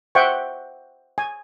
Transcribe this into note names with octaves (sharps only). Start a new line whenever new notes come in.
C5 E5 F#5 G5 C#6
G#5